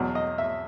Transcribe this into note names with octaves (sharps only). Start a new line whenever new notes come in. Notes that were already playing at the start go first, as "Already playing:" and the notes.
Already playing: E2 B2 F#3
D#5
E5